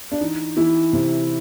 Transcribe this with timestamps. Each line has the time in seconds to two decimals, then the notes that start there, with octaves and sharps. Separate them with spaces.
0.12 D4
0.21 E3 D#4
0.57 E3 E4
0.93 C3